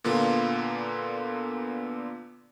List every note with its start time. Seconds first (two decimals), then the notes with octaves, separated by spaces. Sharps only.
0.04 A#2 D3 A#3 B3 F4